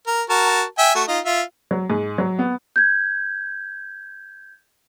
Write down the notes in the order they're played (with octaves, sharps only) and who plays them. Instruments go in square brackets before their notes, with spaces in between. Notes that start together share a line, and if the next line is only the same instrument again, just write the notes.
[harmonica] A#4
F#4 A#4 A5
E5 G5 G#5
A3 F#4
D#4 F4
F4 E5
[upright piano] F#3
G#2
F#3
B3
[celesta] G6 G#6